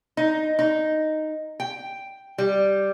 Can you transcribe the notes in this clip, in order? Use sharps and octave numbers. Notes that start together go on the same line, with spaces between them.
D#4
D#4
G5
G3